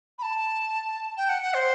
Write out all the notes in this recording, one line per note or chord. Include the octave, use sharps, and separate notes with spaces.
B5
A5
G5
F#5
F#5
C5